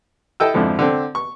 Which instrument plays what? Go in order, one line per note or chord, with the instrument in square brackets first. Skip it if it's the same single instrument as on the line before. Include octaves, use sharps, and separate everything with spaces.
[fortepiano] E4 A4 D#5 G5 A5 E6
F2 G#2 D3 F3 E4
D3 C4
C#6